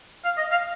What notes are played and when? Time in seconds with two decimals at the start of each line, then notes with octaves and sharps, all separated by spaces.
0.25 F5
0.37 D#5
0.51 F5